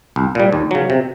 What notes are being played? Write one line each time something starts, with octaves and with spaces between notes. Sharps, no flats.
C2
A#2 G3
D#2
C#3 F#3
C3